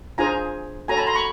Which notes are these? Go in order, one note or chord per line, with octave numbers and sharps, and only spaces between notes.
D4 F4 G#4 C5 G#5 A#5
F#4 A4 C#5 G#5 A#5
A5 B5
A#5 C6
B5 C#6